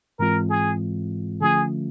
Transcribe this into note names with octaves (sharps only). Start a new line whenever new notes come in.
G#2 E3 G#3 C4 F4 A#4
G#4
D3 F3 A3 C#4 F4 G#4